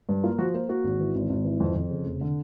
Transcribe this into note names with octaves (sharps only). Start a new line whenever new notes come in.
G2
A#3 F4
F3 F#4
A#3 C5
A#3 F#4
G#1
E3
G#1
G#1
E3
F2
F2
C#3
F1
D3